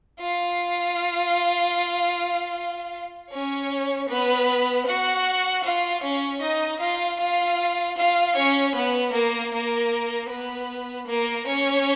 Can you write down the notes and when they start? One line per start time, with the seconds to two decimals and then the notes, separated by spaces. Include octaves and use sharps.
0.20 F4 F5
3.31 C#4 C#5
4.09 B3 B4
4.87 F#4 F#5
5.64 F4 F5
6.03 C#4 C#5
6.41 D#4 D#5
6.81 F4 F5
7.19 F4 F5
7.97 F4 F5
8.36 C#4 C#5
8.75 B3 B4
9.13 A#3 A#4
9.52 A#3 A#4
10.30 B3 B4
11.08 A#3 A#4
11.47 C#4 C#5